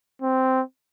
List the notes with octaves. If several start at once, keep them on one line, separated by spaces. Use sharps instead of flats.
C4